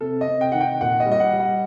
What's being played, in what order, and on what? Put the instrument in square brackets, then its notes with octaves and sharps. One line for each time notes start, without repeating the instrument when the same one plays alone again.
[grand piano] C3 A4
D#5
C3
G5
D#3 F#5
G5
A#2 F#5
D#5
G3
D#5
F#5
G3
F#5